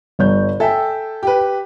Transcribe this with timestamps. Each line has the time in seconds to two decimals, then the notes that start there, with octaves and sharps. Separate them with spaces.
0.19 G1 C#5 G6
0.60 A4 E5 G5 G#5
1.23 G4 B4